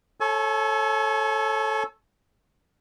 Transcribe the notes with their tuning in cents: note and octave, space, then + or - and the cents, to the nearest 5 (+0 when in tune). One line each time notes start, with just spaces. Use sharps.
A4 +0 C#5 -20 G#5 +45